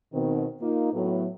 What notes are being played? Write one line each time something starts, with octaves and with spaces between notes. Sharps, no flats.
B2 D#3 C4
A#3 D#4 F4
A2 F#3 B3